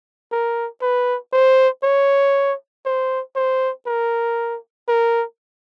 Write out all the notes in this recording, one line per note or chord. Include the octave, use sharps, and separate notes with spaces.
A#4
B4
C5
C#5
C5
C5
A#4
A#4